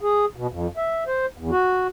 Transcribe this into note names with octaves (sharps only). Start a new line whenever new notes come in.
G#4
B2
F2
E5
C5
E2
F#4